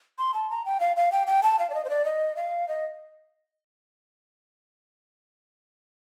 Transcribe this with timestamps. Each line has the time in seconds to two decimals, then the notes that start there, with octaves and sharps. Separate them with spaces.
0.18 C6
0.34 A5
0.50 A#5
0.65 G5
0.80 F5
0.97 F5
1.12 G5
1.27 G5
1.43 A5
1.59 F5
1.70 D5
1.74 D#5
1.85 C5
1.89 D5
2.05 D#5
2.36 F5
2.68 D#5